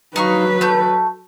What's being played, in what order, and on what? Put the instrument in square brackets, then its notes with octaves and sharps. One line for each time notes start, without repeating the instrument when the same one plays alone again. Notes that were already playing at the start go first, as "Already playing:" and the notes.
[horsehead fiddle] F#3 B4 [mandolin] D#4 F5 C#6
[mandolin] A3 G6